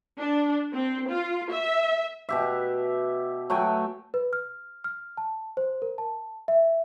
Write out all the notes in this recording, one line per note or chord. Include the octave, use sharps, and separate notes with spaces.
D4
C4
F4
E5
B2 G4 E5
F#3 A3 G5 G#5
B4
F6
F6
A5
C5
A#4
A5
E5